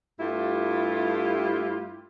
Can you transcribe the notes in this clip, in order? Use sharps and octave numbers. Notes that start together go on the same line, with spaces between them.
G2 A3 E4 F4 G4